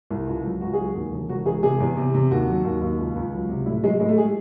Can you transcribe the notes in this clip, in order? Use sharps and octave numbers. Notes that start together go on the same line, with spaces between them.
C2
C#2
F#3
C#2 F#4
F#3 G#4
F#4
D#2
E1
E1 F#4
E1 G#4
C3 G#4
E2
C3
C3
D#2 F#4
F#3
D#2
D#2
C#2
C#2
F#3
C3
A2 E4
F#3 G#3
A2 G#3
A3
G#4